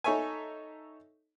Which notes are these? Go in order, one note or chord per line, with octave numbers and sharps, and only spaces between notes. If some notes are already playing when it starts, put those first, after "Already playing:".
D#4 A4 C#5 E5 G#5